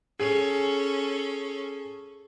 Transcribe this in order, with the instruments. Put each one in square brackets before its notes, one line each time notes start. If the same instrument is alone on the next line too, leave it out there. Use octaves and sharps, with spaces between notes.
[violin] C#4 A4 [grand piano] G#4